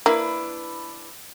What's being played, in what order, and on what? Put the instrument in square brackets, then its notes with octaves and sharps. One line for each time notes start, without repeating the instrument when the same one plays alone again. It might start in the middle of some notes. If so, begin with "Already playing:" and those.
[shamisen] A#3 [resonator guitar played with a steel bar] D4 E4 B4